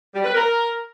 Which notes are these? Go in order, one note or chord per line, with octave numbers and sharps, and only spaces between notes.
G3
B4
A#4